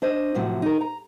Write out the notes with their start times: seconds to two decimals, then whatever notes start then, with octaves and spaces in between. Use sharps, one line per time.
0.02 D4 C5 D#5
0.34 F#2 A2 C3 F3 F#3
0.62 D#4 A#4
0.81 A#5